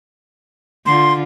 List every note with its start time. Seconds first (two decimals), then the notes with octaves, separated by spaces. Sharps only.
0.86 D3 F4 C6